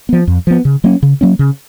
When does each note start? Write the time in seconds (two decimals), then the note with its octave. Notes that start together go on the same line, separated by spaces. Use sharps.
0.09 F3 B3
0.27 F2
0.47 F3 B3
0.65 C#3
0.84 F#3 A#3 C#4
1.03 C#3
1.21 F#3 A#3 C#4
1.39 C#3